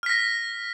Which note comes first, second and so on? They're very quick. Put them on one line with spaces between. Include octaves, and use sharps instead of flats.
F6 B6 A#6